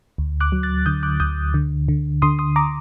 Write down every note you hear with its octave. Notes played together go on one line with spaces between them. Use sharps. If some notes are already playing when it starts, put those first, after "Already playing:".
D2
D6 F#6
F#3
F#6 A6
D3 D#6 G6
D6 F#6
D2 D#6 G6
D3
D3
D3 C6 D#6
C6 D#6
A#5 D6